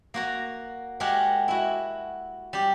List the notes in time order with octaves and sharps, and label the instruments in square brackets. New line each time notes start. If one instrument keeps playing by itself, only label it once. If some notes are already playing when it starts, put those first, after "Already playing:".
[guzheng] A#3 F#4 A#5
G#3 F#4 G4 A#4 F#5
E4 F#4
G3 G4